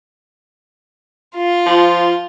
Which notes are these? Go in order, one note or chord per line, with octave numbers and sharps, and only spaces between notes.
F4
F3